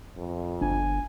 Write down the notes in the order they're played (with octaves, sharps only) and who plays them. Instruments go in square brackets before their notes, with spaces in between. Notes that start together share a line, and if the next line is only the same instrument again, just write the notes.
[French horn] F2
[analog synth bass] G1 [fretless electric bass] D4 [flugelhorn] G#5